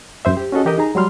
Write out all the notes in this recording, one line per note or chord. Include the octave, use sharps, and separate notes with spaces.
F#2 C5 E5
G4
C#4 F#4 G#4 A4 D#5
E3 G4 A#4 D#5
D#4 G#4 A#5
F#3 G3 C6 F6